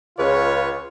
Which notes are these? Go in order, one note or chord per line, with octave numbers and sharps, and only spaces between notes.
C#2 C#3 F4 B4 C#5